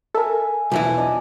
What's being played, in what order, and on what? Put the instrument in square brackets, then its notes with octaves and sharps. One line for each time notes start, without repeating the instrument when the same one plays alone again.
[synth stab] A4 A#4 [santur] E5 G#5
[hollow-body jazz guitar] B1 E2 E3 [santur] F3 B3 G#5
[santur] D4 D5 D#5